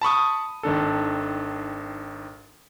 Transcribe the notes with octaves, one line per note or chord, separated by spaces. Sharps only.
A5 B5 C#6 D#6
G#1 D#3 D4 A4